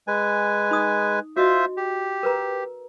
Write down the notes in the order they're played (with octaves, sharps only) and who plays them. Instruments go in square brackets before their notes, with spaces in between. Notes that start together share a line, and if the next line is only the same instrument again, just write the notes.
[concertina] G#3 B4 G#5
[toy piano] D#4 D#6
[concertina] F4 C5 E5 [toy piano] F#4 D#5
[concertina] G4
[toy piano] A#4 B4 A#5